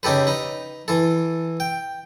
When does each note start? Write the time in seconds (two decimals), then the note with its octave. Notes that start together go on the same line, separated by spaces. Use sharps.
0.03 C#3 D#4 G4 A4 B4
0.27 D#4 B4
0.88 E3 A4
1.60 G5